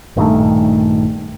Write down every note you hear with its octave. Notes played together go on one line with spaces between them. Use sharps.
A#1 G2 D#3 A3